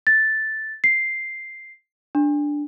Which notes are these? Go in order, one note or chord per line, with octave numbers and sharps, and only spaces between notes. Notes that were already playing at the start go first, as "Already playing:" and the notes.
A6
C7
D4